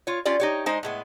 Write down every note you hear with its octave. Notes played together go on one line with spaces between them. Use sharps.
F4 C#5
C#4 F4 G4 D5
D#4 G4 C#5
G#3 D#4 C5
A2 G#3 B3